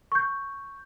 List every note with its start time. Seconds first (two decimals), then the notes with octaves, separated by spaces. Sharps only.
0.12 C#6 G6